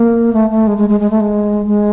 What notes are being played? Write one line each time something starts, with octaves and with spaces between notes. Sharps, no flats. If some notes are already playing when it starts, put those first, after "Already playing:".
Already playing: A#3
A3
A3
G#3
G#3
G#3
G#3
A3
G#3
G#3